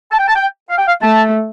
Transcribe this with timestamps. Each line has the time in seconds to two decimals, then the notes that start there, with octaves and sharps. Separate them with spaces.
0.12 A5
0.19 G5
0.28 A5
0.36 G5
0.69 F5
0.78 G5
0.88 F5
1.02 A3 A5